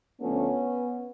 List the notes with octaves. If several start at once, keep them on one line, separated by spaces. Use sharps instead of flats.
D2 D3 F3 A3 B3 C#4